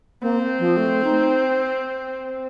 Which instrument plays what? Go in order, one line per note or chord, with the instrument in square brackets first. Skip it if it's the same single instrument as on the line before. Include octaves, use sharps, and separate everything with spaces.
[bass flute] A#3 [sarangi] C4
[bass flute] F3
A3
D#4